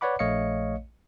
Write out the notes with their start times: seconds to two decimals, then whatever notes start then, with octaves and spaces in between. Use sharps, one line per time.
0.01 B4 C#5 D5 F#5 B5 D6
0.19 A#1 A3 C#5 D#5 F5 C#7